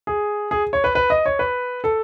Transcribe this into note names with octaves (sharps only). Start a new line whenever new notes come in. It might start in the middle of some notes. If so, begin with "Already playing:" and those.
G#4
G#4
C#5
B4
B4
D#5
C#5
B4
A4